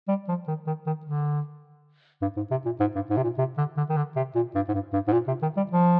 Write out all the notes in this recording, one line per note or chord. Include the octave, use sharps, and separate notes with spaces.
G3
F3
D#3
D#3
D#3
D3
G2
G#2
C3
A#2
G#2
G2
G#2
C3
A#2
C3
D3
D3
D#3
D3
C3
A#2
G2
G#2
G2
G2
G#2
A#2
C3
D#3
G3
F3